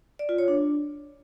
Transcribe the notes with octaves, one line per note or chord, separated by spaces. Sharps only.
D5
F4
C#5
D4